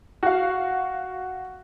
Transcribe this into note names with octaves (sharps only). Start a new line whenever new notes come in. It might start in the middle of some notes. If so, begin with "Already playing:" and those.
F#4 F5